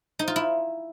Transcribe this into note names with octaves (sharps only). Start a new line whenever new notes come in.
D#4
F4
E4